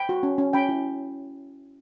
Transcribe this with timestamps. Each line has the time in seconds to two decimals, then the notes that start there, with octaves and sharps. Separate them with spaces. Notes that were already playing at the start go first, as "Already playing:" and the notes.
Already playing: G5 B5
0.09 F#4
0.23 C#4
0.38 C#4
0.53 C#4 G5 B5
0.69 E4